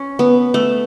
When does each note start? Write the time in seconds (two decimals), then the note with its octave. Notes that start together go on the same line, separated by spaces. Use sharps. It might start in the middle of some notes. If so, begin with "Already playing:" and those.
Already playing: C#4
0.19 B3
0.54 A3